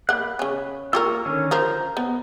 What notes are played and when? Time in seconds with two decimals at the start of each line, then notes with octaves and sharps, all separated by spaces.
0.09 A#3 F#5 B5 F#6
0.39 C#3 C#4
0.93 A#3 F4 G4 A#4 C#6 E6
1.25 D3 D#3 C#4
1.51 F3 A#4 C5 A#5 G6
1.97 B3